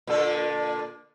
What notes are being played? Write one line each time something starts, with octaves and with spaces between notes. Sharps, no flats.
A#2 D3 A4